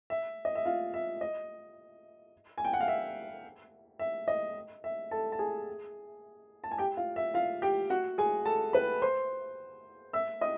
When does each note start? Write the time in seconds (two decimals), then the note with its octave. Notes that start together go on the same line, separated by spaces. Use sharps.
0.10 E5
0.45 D#5
0.55 E5
0.65 F4 F5
0.94 E5
1.21 D#5
2.58 G#5
2.64 G5
2.73 F#5
2.80 F5
2.88 E5
3.99 E5
4.28 D#5
4.84 E5
5.11 A4 A5
5.32 A5
5.39 G#4 G#5
6.64 A5
6.71 G#5
6.78 G4 G5
6.97 F4 F5
7.16 E5
7.34 F4 F5
7.62 G4 G5
7.90 F#4 F#5
8.18 G#4 G#5
8.45 A4 A5
8.73 B4 B5
9.02 C5 C6
10.13 E5 E6
10.41 D#5 D#6